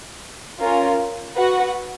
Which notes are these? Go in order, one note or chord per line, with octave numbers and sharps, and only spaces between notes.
C#4 F4 A#4
F#4 B4 F#5